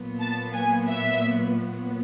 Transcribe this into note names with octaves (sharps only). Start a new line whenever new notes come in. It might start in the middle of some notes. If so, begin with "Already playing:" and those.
Already playing: A#2 F#3 B3
A5
G#5
E5